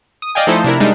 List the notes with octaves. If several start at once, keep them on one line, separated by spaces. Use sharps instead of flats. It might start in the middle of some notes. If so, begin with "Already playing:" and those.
D#6
D5 D#5 F5 G5 G#5
F3 A3 D#4 E4 A4 C5
C3 D4 E4 A#4
G3 G#3 D4 D#4